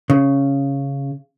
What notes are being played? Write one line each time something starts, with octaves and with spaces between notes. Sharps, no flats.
C#3